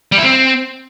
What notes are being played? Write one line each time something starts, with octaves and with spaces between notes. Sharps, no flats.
G3
E4
C4